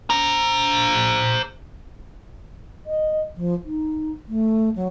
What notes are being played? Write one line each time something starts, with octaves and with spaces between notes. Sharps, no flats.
C5 A#5
D#5
F3
D#4
A3
F#3